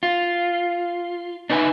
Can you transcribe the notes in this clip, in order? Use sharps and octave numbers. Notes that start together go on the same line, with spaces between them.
F4
D4 D#4 B4 E5 G#5